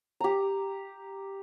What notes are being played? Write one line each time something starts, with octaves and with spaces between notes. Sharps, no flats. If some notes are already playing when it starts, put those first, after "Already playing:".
G4 A#5